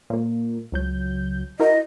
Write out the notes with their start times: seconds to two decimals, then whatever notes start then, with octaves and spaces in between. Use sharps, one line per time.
0.10 A#2 A#3
0.72 C#2 F#3 G6
1.60 E4 F#4 A#4 D#5